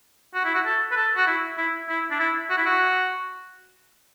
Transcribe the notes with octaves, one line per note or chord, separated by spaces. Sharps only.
F#4
E4
F#4
A4
B4
A4
F#4
E4
E4
E4
D4
E4
F#4
E4
F#4